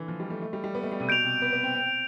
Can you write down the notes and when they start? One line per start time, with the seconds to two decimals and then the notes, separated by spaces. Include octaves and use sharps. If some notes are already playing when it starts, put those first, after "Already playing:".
Already playing: D3 E3
0.08 F3
0.20 G3
0.30 A3
0.42 A3
0.53 G3
0.64 G3
0.75 B3
0.83 A3
0.92 G3
1.00 C3
1.08 B2 G6 D7 F7
1.24 C3
1.42 B3
1.53 B3
1.64 C4
1.74 C4
1.86 C4